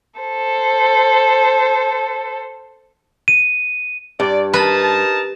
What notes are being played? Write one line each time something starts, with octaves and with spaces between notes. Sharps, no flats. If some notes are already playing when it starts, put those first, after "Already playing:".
A4 C5
D#7
G2 D5
D#4 A#4 B4 A5